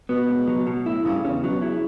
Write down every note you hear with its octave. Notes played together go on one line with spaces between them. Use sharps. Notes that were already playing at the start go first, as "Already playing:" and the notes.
B2 B3
C#2
F#3
B2
A2 E4
G2 C#3
E2 C#4
B2 F#3
C#3 E4